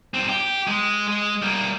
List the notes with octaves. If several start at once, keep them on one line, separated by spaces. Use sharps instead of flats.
G2 C4
G4
G#3
G#3
G3 A#3